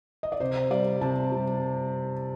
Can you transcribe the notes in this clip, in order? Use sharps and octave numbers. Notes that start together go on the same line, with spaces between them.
D#5
D5
C3 C5
G3 D5
C3 A5
G3